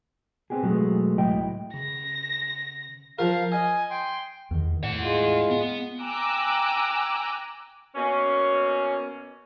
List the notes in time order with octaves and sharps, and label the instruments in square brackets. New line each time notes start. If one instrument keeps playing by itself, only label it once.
[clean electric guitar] B3 C4 D4 G4 G#4
B2 F#3 G#3 A3 B3
C#2 A2 F#3 E4 D#5 G5
[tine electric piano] C#3 [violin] A#6
[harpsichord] F3 A#4 [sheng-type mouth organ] F5
[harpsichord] D#5 [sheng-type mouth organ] G#5
[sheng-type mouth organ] G5 C6
[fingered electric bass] E2 D#3
[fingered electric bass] A2 [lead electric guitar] E4 F#5
[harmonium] G#3 F4
[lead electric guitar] B3
[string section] G5 G#5 A#5 D6 E6 F#6
[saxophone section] B2 A#3 C#4